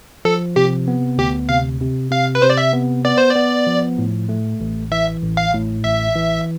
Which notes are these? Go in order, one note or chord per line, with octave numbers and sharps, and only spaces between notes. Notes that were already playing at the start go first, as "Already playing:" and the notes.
F3 A4
C3 G4
B3
D2 G4
C3 F5
C3
C3 F5
B4
C3 C5
D5
E5
B3
B3 D5
C5
D5
B3
F3
A2
A3
A1
E3 E5
A1
F5
A2
A1 E5
E3